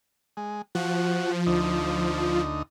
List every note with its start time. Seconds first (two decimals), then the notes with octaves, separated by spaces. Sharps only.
0.37 G#3
0.75 F3 F#4
1.46 D2 D#4